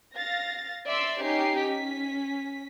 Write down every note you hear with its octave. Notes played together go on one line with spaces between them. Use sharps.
F5 A6 A#6
D5 E5 C6 E6
C#4 D#4 G4 C7
C#4 B6